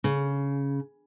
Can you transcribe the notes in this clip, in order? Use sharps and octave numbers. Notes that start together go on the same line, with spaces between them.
C#3